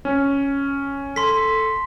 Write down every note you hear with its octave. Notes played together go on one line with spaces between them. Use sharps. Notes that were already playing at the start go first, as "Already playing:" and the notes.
C#4
A4 C6 B6